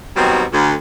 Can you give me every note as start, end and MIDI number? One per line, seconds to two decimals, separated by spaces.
0.17 0.43 47
0.17 0.43 51
0.17 0.43 54
0.17 0.43 55
0.17 0.43 60
0.52 0.72 38